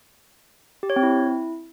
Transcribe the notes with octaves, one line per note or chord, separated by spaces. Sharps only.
G4
C#5
C4
E4